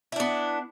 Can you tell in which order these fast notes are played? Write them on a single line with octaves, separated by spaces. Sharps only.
E4 D4 B3